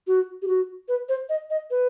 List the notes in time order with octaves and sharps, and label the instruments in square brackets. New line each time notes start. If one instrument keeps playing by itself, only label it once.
[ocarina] F#4
G4
F#4
B4
C5
D#5
D#5
B4